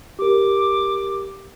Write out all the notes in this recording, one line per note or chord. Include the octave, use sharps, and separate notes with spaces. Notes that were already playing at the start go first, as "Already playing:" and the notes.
G4 A#4 D6